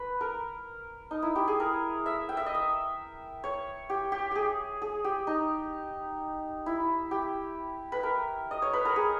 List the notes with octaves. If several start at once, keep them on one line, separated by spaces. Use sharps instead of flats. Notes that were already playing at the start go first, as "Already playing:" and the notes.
Already playing: B4
A#4
D#4
E4
G4
G#4
A#4
E5
G5
E5
D#5
E5
C#5
G4
G4
G4 G#4
G#4
G4
D#4
E4
G4
B4
A#4
D#5
C#5
B4
A#4
G#4